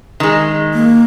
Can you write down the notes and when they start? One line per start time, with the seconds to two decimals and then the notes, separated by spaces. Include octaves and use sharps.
0.20 D#3 G#3
0.74 A#3